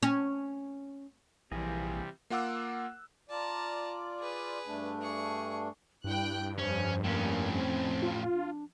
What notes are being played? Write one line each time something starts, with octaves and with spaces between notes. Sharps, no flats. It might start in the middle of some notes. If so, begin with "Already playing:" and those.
C#4
A#1 C3 E3 G3 A#3 G#4 D#5
A#3 F4 F#5 D6 E6 F#6
F4 D5 A5 A#5
G#4 B4
G2 A3 D4
G#4 C#6
G2 E4 G5 F#6
F2 C#4 C5
A2 A#3 C#4
C4
F4
D4